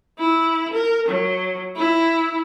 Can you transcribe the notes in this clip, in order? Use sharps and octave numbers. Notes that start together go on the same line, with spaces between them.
E4
A#4
F#3
E4